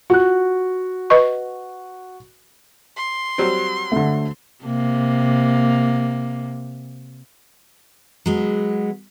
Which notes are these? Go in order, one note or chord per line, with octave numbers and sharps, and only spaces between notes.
F4 F#4 F#6
B4 D#5 C#6
C6
F#3 G3 C4
D3 A3
C3 A#3
F#3 G#3 B3